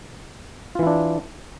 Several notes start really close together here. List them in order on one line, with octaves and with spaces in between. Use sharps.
F4 E3 E4 D4